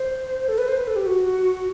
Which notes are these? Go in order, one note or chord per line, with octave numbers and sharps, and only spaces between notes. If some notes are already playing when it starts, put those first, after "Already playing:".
Already playing: C5
A4
B4
C5
B4
A4
G4
F#4